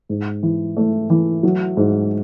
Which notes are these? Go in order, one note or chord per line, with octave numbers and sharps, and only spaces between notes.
G#2
E3
A3
E3
F#3
G#2